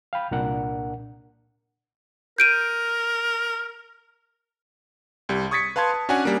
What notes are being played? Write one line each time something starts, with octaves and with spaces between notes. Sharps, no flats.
F5 G5 B5
C2 A#2 D4 A#4 F#5
A#4 G6 D7 D#7
C2 G3
C#6 D#6 G#6 A6 B6 C#7
B4 F5 A5 C6 G#6
A5
C#4 D4 F#4 F#5 G#5 F#6
G3 A#3